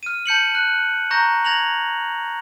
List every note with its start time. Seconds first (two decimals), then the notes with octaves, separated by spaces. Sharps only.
0.03 F6 D#7
0.26 A5 G6 C#7 F#7
0.55 F#6
1.11 A#5 C#6 G6 A#6
1.45 G#6 A#6 F7 F#7